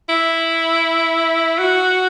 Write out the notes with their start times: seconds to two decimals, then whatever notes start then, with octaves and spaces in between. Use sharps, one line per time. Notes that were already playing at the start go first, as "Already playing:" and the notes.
0.09 E4
1.59 F#4